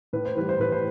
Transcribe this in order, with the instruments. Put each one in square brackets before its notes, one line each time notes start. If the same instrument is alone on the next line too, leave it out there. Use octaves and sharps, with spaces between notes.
[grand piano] A2 B4
C5
E3 G3 B4
C5
A2 B4
C5